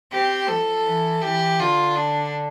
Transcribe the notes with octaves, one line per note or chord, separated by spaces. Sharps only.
C4 G4
F3 A4
E3
E3 G4
D3 F4
D4